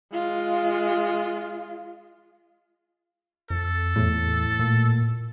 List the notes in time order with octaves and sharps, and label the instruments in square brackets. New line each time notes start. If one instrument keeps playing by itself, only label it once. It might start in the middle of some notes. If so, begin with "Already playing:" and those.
[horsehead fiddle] G#3 F4
[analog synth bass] F2 [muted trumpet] A4
[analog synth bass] E2 [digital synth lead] A2
[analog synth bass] A#2